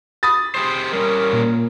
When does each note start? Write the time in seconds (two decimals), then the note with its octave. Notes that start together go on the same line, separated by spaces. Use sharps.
0.23 B5 D#6 A6
0.55 G4 G#4 C5
0.93 G3 C#4 A#4
1.33 A#2